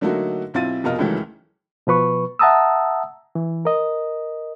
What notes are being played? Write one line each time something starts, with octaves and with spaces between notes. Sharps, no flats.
D3 F#3 A3 A#3 D#4 F#4
B1 C4 E4 F4 A6 D#7
F1 B2 F4 A#4 D#5 F6
C#2 D#3 E3 F#3 A3
B2 F3 B4 C#6
E5 F#5 A5 A#5 D#6 E6
E3
A#4 D#5